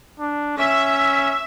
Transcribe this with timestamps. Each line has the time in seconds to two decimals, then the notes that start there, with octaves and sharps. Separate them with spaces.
0.20 D4
0.59 C#4 E5